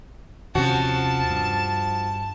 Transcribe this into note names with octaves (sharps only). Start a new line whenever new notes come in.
D#2 C3 F3 C#4 F#4 A5
G2